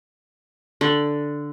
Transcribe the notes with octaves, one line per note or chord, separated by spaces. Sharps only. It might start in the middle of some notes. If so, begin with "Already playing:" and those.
D3